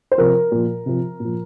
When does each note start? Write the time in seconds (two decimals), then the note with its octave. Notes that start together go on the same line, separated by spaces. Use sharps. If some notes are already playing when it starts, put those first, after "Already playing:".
0.12 C5
0.18 C3 F3 A#4
0.52 A#2 F3
0.86 C3 F3
1.20 A#2 F3